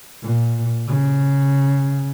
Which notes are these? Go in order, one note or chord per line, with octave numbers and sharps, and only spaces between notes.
A#2
C#3